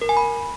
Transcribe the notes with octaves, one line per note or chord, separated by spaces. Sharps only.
A#4
G#5
B5